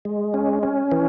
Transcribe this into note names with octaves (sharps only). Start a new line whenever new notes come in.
G#3
C#4
C#4
E3